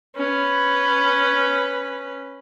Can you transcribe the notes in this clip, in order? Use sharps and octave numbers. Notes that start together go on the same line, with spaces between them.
C#4 B4